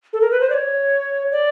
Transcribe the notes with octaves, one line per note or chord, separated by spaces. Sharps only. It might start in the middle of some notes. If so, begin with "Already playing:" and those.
A4
A#4
B4
C5
D5
C#5
D5